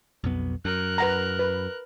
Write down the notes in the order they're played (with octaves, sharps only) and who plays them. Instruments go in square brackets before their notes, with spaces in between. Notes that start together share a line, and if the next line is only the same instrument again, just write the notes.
[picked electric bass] B1 F2 B3
[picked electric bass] F#2 [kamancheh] A#4 F#6
[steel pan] B4 F#5 A#5
B4